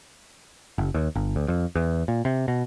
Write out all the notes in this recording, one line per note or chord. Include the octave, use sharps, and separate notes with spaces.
F#1
D#2
G1
D2
F2
E2
A#2
C3
B2